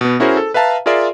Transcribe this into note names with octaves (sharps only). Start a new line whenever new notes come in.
B2 B3
C#4 E4 F#4 G#4 A#4 C5
A4
B4 E5 F5 A5 A#5
F4 G#4 A#4 D5 E5 C6